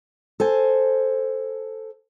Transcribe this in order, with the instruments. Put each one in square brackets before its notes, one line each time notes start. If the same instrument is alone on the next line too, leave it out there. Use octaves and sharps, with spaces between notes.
[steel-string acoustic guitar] A4 C5 G#5